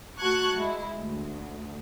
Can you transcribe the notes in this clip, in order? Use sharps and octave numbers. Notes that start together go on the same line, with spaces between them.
A3 F#4 A5 C#6 F#6 G#6
G#3 E4
D2